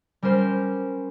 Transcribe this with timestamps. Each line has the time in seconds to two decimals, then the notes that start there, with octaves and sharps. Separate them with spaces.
0.22 G3 C#4 A#4 C5